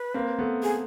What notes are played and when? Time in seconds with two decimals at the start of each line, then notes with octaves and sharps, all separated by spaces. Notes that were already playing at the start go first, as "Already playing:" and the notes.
Already playing: B4
0.14 A#3 C4
0.39 A3 B3
0.63 G#4